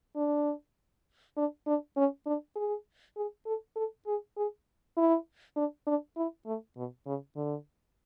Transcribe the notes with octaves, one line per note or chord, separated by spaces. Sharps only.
D4
D4
D4
C#4
D4
G#4
G#4
A4
A4
G#4
G#4
E4
D4
D4
E4
A3
B2
C#3
D3